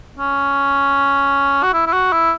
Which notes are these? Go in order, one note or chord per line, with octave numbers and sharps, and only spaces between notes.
C#4
F#4
E4
E4
F#4
E4